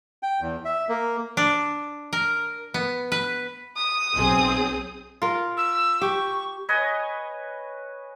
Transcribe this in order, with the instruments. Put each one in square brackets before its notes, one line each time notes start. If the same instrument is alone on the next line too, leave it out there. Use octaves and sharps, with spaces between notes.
[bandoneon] G5
E2
E5
A#3
[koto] D4
A#4
B3
B4
[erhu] D#6
[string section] B1 C4 G#4
[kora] F4 A#4
[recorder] E6
[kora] G4 [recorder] C#6
[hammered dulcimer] B4 C#5 D#5 G#5